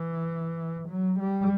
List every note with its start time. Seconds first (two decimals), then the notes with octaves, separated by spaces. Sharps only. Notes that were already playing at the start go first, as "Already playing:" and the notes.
Already playing: E3
0.89 F#3
1.20 G3